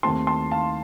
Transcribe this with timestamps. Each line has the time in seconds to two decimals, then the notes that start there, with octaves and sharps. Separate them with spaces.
0.03 D#2 D#3 A3 C4 A5 C6
0.27 A5 C6
0.51 F5 A5